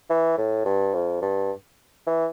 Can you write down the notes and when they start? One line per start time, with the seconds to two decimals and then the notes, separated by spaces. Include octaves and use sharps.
0.10 E3
0.38 A2
0.65 G2
0.94 F2
1.22 G2
2.06 E3